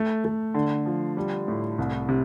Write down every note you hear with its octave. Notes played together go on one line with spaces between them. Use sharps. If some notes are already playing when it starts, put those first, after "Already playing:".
Already playing: A3
A3
D3
F3
G3
A2
C2
C3